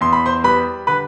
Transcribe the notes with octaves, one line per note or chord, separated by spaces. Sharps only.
E2 C6
B5
C5 C6
G3 B4 B5
D3 B4 B5